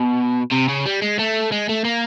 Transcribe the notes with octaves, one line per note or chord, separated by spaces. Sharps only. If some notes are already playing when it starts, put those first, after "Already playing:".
Already playing: B2
C3
C#3
G3
G#3
A3
G#3
A3
A#3